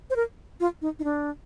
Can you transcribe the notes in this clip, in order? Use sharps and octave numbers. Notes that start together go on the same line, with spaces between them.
C5
A#4
F4
D#4
D#4
D4